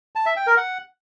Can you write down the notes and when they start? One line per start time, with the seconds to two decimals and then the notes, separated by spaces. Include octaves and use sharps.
0.16 A5
0.26 E5
0.36 G5
0.47 A#4
0.57 F#5